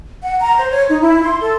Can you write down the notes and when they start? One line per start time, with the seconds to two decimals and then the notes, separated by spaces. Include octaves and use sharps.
0.22 F#5
0.41 A#5
0.56 C5
0.72 C#5
0.88 D#4
1.01 E4
1.24 C6
1.42 A4